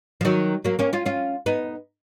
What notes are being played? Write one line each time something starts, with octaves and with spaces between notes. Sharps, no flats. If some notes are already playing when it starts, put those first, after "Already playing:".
F3
D#3 F#3
F#3 A#3
A#3 C#4
C#4 F4
C#4 F4
B3 D#4